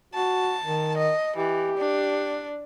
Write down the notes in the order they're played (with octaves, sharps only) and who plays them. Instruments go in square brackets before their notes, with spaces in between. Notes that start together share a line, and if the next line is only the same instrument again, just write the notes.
[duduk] F#4 [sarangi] A5
[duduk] D#3
[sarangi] D#5
[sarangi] E3 [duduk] G4
[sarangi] D4